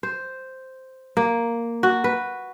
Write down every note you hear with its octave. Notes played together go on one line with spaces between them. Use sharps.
C5
A#3
F#4
B4